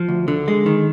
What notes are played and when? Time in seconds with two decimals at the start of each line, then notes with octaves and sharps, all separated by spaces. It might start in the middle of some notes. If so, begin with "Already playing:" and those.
Already playing: F3
0.09 D2
0.28 D3
0.48 G#3
0.66 D#3